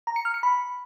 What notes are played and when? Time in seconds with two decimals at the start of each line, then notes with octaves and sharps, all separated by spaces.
0.07 A#5
0.16 C#7
0.25 F6
0.34 C#7
0.43 B5